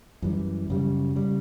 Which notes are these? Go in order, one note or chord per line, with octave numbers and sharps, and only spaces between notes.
F#2 E3 G3
F#2 C#3 G3
C#3 G3